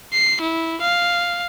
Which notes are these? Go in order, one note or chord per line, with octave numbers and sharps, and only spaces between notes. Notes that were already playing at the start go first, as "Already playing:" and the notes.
C7
E4
F5